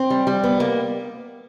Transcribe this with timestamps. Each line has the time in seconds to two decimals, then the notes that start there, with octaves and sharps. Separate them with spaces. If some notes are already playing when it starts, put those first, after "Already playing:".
Already playing: C4
0.10 G3
0.27 G3
0.44 B3
0.60 A#3